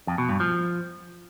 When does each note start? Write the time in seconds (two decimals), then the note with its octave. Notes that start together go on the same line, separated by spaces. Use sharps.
0.07 F2
0.18 B2
0.29 G2
0.40 F3